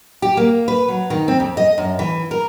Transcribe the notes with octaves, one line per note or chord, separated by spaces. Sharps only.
G4
A#3
B4
F#3
D#3
C4
F2
D#5
F#2
E3
A#4